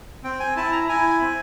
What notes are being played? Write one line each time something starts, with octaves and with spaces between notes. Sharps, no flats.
C4 G5
G#5
E4 A5
A#5
E4 G#5
C4